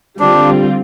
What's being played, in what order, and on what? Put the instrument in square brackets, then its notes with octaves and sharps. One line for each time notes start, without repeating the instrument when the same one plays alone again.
[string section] D3 G3 C4 F4 [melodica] D4